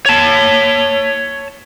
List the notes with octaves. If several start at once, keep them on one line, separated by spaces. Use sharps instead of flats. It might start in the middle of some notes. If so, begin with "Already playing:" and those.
C#5 A5